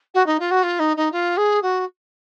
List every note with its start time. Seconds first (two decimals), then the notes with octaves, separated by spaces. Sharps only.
0.14 F#4
0.26 D#4
0.39 F4
0.50 F#4
0.63 F4
0.79 D#4
0.96 D#4
1.12 F4
1.37 G#4
1.62 F#4